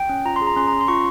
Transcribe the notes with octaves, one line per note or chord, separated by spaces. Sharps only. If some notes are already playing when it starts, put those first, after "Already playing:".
Already playing: G5
C#4
F4 A#5
C6
G#4
A#5
C#4 C6
A#5
C#4
C6
F4 C#6